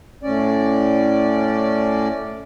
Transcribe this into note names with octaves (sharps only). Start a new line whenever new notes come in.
A2 C#4 D5